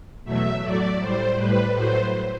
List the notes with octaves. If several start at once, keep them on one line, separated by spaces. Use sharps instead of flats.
E2 B2 F#3 A3 E5
A2 F#3 A3 D5
A2 G3 C5
A2 G3 B4
A2 F#3 A3 C5